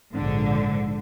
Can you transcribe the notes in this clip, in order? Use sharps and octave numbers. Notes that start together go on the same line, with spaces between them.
A#1 G#2 D3